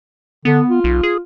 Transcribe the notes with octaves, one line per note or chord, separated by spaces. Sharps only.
D3 B3
F4
B1
G#4